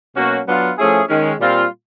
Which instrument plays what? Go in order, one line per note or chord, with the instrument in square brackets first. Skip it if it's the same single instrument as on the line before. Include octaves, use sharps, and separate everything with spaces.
[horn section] B2 F#3 A#3 C#4 F#4
F#3 B3 D4 F4
F3 A3 C#4 E4 G#4
D#3 G#3 C#4
A#2 G3 C4 F4